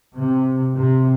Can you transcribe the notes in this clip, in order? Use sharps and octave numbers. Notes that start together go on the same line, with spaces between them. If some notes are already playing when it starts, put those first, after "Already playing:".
C3
C3